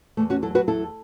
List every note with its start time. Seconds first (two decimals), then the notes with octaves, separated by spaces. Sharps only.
0.17 E2 A3
0.30 C#4 F#4
0.42 F#3 E4 A4
0.55 F#4 B4
0.67 E2 E4 A4